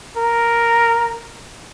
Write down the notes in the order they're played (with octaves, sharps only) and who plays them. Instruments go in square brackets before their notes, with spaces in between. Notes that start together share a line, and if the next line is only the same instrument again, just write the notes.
[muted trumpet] A#4